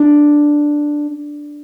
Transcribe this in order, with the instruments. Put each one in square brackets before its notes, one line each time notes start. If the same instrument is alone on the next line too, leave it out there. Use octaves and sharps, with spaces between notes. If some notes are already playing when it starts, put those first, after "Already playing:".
Already playing: [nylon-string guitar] D4